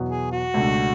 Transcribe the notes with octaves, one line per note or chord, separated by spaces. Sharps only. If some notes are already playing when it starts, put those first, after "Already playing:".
Already playing: E2 B2 F#3 B3
G#4
F#4
C#2 B2 A3 D4